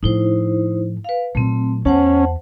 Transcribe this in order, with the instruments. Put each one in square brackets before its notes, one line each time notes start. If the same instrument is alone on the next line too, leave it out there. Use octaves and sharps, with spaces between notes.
[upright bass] A2 F3 [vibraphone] D#4 E4 C5
[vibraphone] B4 F5
[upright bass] A#2 F#3 [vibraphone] A3 C4
[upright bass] E2 B3 [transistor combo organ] C#4 [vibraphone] C5 F#5 A5